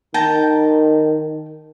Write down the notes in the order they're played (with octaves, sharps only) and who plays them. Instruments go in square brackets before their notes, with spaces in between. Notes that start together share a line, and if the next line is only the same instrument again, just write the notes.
[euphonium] D#3 [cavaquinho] G5 A5 A#5